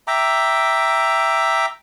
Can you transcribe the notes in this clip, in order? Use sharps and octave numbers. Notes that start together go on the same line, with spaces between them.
E5 G5 A#5 D6